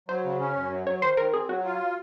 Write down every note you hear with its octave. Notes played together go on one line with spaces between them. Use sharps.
F#3 C5
C#3
C#4
F#2
F#3
F#3 C#5
D#3 C5
D#3 A#4
C4 G#4
F#3 F#4
F4